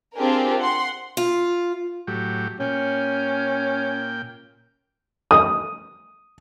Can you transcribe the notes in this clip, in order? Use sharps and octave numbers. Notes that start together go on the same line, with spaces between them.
C4 D4 F4 G4 G#4 A#4
F#5 C6
F4
A2 F#3 G4
A#2 C#4 G5
D#6